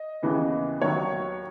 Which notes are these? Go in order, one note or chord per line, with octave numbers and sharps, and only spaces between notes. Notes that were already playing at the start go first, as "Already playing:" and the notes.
Already playing: D#5
D#2 C#3 E3 B3
D#2 D#3 F#3 C#5